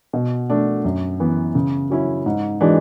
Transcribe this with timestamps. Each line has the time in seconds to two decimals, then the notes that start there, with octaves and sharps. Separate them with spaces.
0.13 B2
0.50 A3 D4
0.85 F#2
1.20 E3 B3
1.55 C#3
1.90 F#3 C#4 E4
2.26 G#2
2.61 E3 G#3 D4 F#4